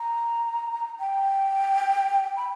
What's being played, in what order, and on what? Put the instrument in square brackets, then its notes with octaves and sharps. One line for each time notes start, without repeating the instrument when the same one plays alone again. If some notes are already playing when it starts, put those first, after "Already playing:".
Already playing: [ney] A#5
G5
B5